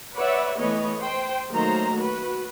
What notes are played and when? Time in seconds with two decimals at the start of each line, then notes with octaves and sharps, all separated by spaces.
0.16 B4 C#5 D5 E5 F#5
0.60 E3 A3 B3 B4 C#5 D#5
1.01 C5 G5
1.52 D#3 F#3 A3 A#3 C5 A#5
1.96 F#4 B4